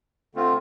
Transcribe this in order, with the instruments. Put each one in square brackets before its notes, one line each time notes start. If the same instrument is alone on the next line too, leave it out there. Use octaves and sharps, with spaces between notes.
[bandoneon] D3 A3 C4 F4